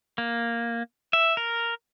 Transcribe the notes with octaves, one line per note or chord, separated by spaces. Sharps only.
A#3
E5
A#4